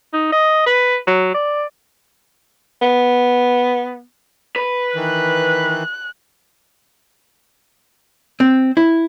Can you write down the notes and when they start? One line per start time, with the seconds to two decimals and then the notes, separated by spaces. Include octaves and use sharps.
0.13 D#4
0.32 D#5
0.66 B4
1.07 F#3
1.34 D5
2.81 B3
4.56 B4
4.95 D#3 E3 F#6
8.40 C4
8.77 E4